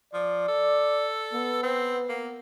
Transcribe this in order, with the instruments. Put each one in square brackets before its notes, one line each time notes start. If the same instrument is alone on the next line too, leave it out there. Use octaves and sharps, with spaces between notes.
[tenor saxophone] F3 [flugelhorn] D5
[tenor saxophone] A4
[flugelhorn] B3
[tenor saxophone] C4
A#3